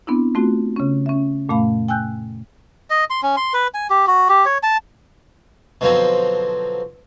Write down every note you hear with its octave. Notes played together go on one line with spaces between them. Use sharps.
B3 C4 D4 E4
A3 C4 F4 F#4
C#3 C#4
C#4 E5
F#2 A#2 A3 F5 B5
G5 G#5 E6 F#6 G6
D#5
C6
C#4
C6
B4
G#5
G4
F#4
G4
C#5
A5
B2 D3 F3 F#3 C4